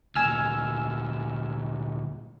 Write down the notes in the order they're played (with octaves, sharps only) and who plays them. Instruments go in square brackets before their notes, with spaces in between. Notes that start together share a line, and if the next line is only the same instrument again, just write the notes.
[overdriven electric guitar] D2 A#2 [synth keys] G#5 E6 F6